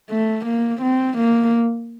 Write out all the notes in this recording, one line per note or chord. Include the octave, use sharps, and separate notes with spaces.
A3
A#3
C4
A#3